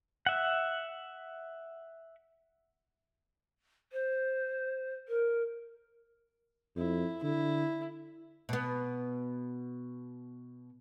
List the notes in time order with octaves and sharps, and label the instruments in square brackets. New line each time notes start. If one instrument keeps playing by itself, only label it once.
[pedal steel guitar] E5 F#5
[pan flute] C5
A#4
[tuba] F2 [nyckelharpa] E4
[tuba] D3 [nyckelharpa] E4
[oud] B2 B3